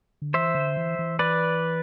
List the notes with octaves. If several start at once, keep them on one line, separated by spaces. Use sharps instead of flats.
D3
E3 C5 E5
D3
E3
E3
B4 D5